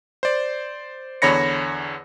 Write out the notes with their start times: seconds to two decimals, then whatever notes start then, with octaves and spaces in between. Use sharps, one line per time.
0.23 C5 D5
1.22 E2 D3 C#5 B5 A#6 C#7